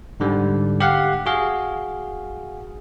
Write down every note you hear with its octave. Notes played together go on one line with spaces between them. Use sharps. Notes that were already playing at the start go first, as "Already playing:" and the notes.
G#2 D3 G3
G4 F5 F#5
F#4 G#4 F5